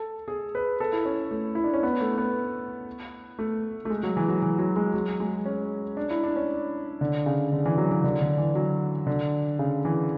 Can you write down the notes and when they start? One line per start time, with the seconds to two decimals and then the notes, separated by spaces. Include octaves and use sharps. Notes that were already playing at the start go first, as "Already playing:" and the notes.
Already playing: A4
0.28 G#4
0.55 B4
0.80 A4
0.93 E4
1.05 C#4
1.31 A3
1.55 E4
1.64 D4
1.73 C#4
1.83 B3
2.01 A3
2.18 B3
3.39 A3
3.85 A3
3.90 G#3
4.03 F#3
4.17 E3
4.28 F#3
4.42 E3
4.59 F#3
4.76 G#3
4.94 F#3
5.20 G#3
5.46 C#4
5.97 D4
6.10 E4
6.23 D4
6.36 C#4
7.01 D3
7.26 C#3
7.52 D3
7.66 E3
7.78 F#3
7.92 E3
8.04 D3
8.21 D3
8.38 E3
8.55 F#3
9.07 D3
9.59 C#3
9.85 E3